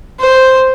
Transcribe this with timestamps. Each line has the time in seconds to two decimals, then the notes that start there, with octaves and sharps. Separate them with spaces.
0.20 C5